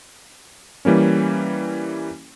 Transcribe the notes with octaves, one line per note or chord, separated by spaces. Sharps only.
E3 G3 A#3 C#4